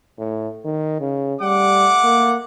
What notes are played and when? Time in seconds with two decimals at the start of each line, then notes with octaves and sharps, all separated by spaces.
0.18 A2
0.65 D#3
1.00 C#3
1.41 G3 A3 F#5 D6
2.04 A#3